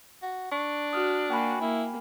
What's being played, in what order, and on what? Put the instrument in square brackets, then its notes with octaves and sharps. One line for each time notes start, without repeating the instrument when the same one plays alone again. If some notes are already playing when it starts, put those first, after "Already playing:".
[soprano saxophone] F#4
[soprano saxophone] D4 [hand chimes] C#6
[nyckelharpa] F#4 [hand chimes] D#6 F6
[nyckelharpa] A#3 [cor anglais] F#4 [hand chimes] G5 G#5 B5
[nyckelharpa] A#3 [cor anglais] E4